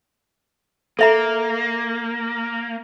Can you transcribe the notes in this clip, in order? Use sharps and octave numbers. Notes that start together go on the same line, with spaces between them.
A#3 A4 E5 A#5